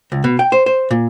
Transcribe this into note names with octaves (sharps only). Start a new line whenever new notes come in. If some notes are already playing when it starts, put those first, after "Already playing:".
C#2
B2
G5
C5
C5
A#2